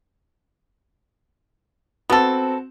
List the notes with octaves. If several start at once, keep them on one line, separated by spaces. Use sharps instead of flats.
B3 C4 F#4 A4